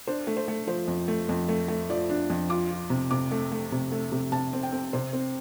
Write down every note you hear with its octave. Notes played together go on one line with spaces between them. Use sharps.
D4 C5
A3
C5
A3
F3 C5
F2
A3
F2
A3
A3
F3 D5
D4
F2
F4 D6
F4
C3
C3 D6
A3
A3
C3
A3
C3
C3 A5
C4
G5
C4
C3 C5
C4